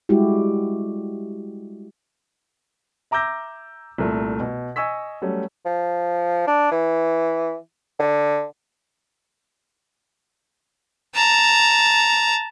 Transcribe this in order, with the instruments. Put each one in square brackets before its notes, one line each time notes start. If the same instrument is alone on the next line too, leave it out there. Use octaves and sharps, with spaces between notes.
[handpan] G3 G#3 E4 F#4 G4
[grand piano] E5 A#5 D6 E6 G6 A#6
C2 A#2 A3
B2
D#5 G#5 C#6 E6 B6
F#3 G3 A3 C#4
[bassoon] F3
D4
E3
D3
[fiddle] A5 A#5